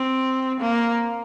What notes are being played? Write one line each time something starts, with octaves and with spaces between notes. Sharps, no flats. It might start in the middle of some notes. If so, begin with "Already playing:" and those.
Already playing: C4
A#3